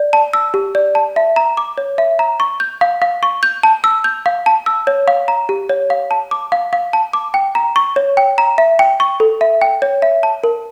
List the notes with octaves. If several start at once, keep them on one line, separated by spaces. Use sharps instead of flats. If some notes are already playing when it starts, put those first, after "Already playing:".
Already playing: D5
A5
E6
G4
D5
A5
E5
A#5
D6
C#5
E5
A#5
C#6
G6
F5
F5
C#6
G6
A5
E6
G6
F5
A5
E6
C#5
F5
A#5
G4
C#5
F5
A5
D6
F5
F5
A5
D6
G5
A#5
C#6
C#5
G5
A#5
E5
G5
C#6
A4
E5
G5
C#5
E5
A5
A#4